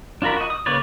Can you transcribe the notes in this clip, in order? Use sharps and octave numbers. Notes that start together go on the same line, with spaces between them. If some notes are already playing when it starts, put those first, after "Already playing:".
D4 F4 F#4 A#4 B5
F#4 D#5
D#6
C#3 A#3 B4 C#5 D5